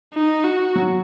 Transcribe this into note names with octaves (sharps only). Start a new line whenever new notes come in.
D#4
F#4
F#3